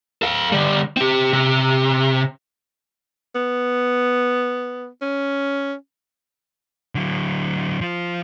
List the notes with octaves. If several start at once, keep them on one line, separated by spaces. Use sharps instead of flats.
A4 F5
D3 G3
C4 G4
C3
B3
C#4
D3 F#3
F3 F4